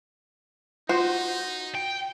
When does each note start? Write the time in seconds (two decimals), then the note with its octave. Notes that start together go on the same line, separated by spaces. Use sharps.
0.89 D#4 F4 F#4 C5 C6
1.75 G5